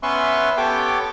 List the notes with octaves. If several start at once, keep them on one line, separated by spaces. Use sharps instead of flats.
B3 C#4 B4 E5 C6 C#6
B3 G4 A4 C#5 G5 D6